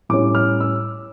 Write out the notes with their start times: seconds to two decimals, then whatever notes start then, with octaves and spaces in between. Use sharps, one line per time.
0.09 A2 G3 C#4 D6
0.35 F6
0.60 E6